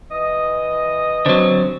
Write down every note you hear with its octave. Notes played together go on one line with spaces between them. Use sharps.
E3 D#5
D3 F#3 C4